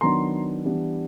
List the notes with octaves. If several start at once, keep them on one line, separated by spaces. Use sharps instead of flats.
D#3 F#3 B3 D4 A#5 C6
E3 G3 B3 D4